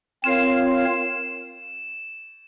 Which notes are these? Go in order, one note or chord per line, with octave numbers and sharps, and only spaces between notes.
C4 F4 A#4 C#5 F5 E7